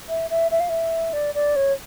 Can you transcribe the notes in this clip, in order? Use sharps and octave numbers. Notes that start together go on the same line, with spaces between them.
E5
E5
E5
F5
E5
D5
D5
C#5